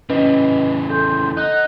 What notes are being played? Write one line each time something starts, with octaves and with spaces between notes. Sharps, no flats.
C#3 E3 C#4 B4 D#5
A4 C6 G6
D#4 F#5 F#6 G6